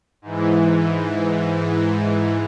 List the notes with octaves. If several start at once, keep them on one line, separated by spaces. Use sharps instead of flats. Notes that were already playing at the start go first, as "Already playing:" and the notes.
G#2 E3